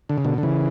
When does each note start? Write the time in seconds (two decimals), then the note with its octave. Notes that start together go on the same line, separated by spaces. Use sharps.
0.09 D3
0.18 C#3
0.25 B2 D3
0.38 D3
0.43 C#3 E3